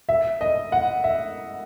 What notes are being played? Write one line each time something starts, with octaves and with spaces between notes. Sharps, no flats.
E5
D#5
F#5
E5